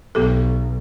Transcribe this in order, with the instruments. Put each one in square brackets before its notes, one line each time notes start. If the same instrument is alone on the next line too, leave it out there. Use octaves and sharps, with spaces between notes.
[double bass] B1 [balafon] B3 G4 A4